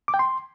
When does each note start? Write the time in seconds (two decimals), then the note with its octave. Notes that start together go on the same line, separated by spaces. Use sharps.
0.08 D6
0.14 G5
0.19 C6